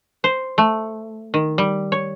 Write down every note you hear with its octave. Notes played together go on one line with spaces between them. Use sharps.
C5
A3
D#3
G3
C#5